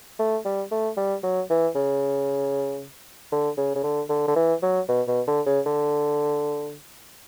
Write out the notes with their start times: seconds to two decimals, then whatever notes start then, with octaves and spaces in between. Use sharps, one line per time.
0.19 A3
0.45 G3
0.71 A3
0.97 G3
1.23 F#3
1.50 E3
1.75 C#3
3.32 D3
3.58 C#3
3.75 C#3
3.84 D3
4.09 D3
4.28 D3
4.36 E3
4.63 F#3
4.89 B2
5.08 B2
5.28 D3
5.47 C#3
5.66 D3